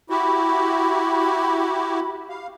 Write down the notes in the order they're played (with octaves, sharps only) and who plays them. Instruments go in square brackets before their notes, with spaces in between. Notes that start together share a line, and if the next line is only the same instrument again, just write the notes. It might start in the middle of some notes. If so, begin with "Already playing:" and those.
[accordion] E4 F#4 G4 [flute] B5
[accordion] F5